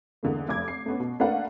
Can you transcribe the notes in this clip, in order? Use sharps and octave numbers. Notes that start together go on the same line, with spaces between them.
E2 D3 G#3 A#3
F1 D6 G#6
C7
A3 B3 C#4
B2
A3 A#3 D4 B4 F5 F#5